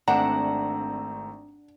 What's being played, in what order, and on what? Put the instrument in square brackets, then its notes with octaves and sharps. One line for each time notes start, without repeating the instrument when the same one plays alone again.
[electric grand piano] G#1 A3 C4 [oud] D4 [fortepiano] F#5 [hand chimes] A#5